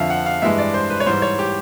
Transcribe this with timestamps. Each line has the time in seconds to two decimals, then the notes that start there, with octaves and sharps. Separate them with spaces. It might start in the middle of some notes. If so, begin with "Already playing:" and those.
Already playing: F2 D3 F3 E5 F5
0.10 F#5
0.26 F5
0.42 G2 E3 G#3 E5
0.58 D5
0.74 C5
0.90 B4
1.00 C#5
1.06 G#2 E3 G3 C5
1.22 C#5
1.39 G4